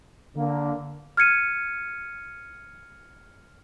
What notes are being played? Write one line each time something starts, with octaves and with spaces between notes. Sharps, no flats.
D3 A#3
F6 G#6 C#7 D#7